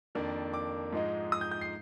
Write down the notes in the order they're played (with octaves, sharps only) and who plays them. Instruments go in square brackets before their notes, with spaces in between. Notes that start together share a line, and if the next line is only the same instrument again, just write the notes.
[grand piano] F2 D#3 A#3 D4
D6
G#2 F3 G#3 D#4
D#6
G6
G6
C7